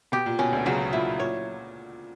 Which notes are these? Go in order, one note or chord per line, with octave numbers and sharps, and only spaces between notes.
B2 G4
A#2
B2 C#4
D2 D3
C#2 C#3 F#3
A#2 E4
A#2 C#5